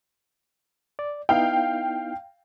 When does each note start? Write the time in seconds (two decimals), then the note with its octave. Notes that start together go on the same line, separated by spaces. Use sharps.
0.99 D5
1.29 B3 D#4 E4 F5 G5